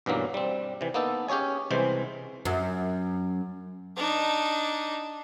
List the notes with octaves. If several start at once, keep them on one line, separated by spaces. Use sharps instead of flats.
B1 G2 E3 F#3 A#3
G3 C4
C3 E3
A#3 B3 D#4 A4
C#4 G4 G#4 C#5 G#5
C2 C3 E3 G#3 C5
F#2
D4 D#4